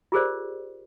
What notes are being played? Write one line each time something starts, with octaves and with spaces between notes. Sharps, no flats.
F4 G4 G#4 A#4 C5 D5